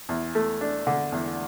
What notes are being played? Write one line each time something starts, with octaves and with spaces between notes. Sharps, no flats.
E2
A3
D4
D3
E2